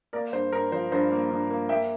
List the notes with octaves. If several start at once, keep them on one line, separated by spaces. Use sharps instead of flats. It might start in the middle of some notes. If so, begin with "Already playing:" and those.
A#3 A#4 D5
G2 C5
G2 A#4
F3 C5
G2 C5
A#3
G2
A#3
A#3 E5 G5